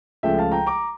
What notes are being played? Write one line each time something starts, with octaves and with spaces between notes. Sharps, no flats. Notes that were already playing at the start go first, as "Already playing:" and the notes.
C#2 C#3 F3 A3 E5 G5
F5 A5
G5 A#5
A#5 D6